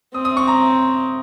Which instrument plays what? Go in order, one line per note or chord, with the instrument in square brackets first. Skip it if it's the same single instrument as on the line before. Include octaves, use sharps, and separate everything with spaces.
[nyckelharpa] C4 [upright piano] D#6
[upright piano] D#6
C#6
A#5